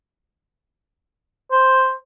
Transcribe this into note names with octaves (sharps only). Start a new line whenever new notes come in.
C5